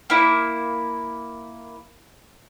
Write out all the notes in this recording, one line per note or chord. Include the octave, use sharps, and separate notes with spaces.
A#3 E4